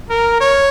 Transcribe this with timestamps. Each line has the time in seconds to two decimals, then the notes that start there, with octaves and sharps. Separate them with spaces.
0.10 A#4
0.41 C#5